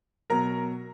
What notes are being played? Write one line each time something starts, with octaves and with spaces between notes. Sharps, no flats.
B2 F#3 A#4 A#5